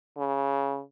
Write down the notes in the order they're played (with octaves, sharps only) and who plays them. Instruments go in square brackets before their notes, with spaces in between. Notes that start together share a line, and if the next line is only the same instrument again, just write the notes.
[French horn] C#3